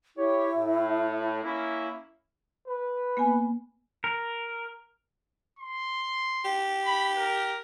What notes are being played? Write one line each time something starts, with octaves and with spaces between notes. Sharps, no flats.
E4 G4 C#5
A2
A#3 C#4 E4
B4
A#3 B3 G#5
A#4
C6
G4
B5
A#4